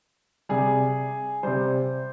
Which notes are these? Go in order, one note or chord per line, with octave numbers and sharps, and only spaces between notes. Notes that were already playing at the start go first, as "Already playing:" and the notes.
C3 G3 G#4
C3 G3 C5